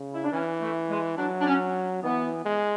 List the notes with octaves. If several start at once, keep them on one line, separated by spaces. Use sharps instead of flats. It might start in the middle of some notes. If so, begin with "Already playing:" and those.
Already playing: C#3
E4
D4
E3 C#4
A3
G#3
F#3 D4
D4
C#4
E3 B3
G#3